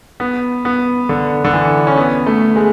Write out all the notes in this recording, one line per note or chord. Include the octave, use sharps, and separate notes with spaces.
B3
B3
D3
D3
E3
C#4
B3
A3
G#3